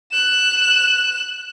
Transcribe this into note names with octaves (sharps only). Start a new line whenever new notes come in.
F#6 E7